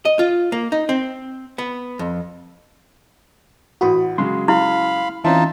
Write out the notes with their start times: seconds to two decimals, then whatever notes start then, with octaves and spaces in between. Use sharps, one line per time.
0.05 D#5
0.19 F4
0.52 A#3
0.72 D#4
0.89 C4
1.58 B3
1.99 F2
3.81 A1 F#4 B5 D#6
4.18 C#3 F#3 G#3 C6
4.48 E4 F5 B5
5.24 E3 C4 C#4 D#4 F4 E5 A5